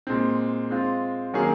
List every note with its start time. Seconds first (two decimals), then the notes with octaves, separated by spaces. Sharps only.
0.07 A#2 G#3 C4
0.70 G#3 C4 F4
1.34 D#3 F#3 A#3 C#4 G#4